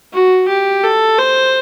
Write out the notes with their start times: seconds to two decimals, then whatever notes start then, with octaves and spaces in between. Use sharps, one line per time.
0.13 F#4
0.48 G4
0.84 A4
1.18 C5